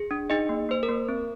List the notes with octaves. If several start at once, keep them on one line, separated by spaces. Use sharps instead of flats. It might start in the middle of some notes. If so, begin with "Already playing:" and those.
Already playing: G#4
D4
D#4 G#4 D#5
A#3
A#3 C5
A#4
A#3
C4